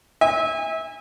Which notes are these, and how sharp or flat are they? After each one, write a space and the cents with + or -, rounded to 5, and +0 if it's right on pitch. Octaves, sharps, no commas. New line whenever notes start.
E5 -30 G#5 -35